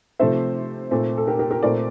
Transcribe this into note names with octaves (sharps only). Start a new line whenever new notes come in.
C3 F3 A3 C4 C5 E5
A#2 A3 C4
A4
G4 A#4
G4 A#4
G4 A#4
A#2 A3 C4 A#4 D5